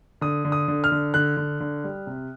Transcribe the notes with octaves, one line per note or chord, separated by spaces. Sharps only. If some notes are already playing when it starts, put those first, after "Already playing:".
D3 D#6
D3
D#6
D3
F6
D3
D3 F#6
D3
D3
G3
C3